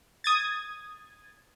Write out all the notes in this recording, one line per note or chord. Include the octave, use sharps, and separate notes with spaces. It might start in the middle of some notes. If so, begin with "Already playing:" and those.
D#6 G#6 A6